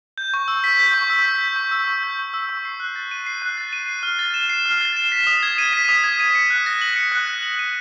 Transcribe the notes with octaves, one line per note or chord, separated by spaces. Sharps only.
G6
C#6
E6
B6
G6
C#6
E6
B6
G6
C#6
E6
C#6
G6
C#6
E6
C#6
C7
F#6
A6
D#7
C7
F#6
A6
D#7
C7
F6
A6
E7
C7
F6
A6
E7
B6
D#6
G#6
D#7
B6
D#6
G#6
D#7
C#7
F#6
A#6
F#7
C#7
F#6
A#6
F#7
D#7